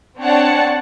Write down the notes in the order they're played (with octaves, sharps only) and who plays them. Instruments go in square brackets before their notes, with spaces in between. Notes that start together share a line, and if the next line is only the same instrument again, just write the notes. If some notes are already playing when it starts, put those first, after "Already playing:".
[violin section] C4 D4 C#5 F#5 A5